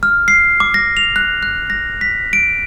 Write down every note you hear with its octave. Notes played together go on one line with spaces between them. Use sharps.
F6
C7
D6
A#6
F7
F#6
F#6
A#6
B6
D7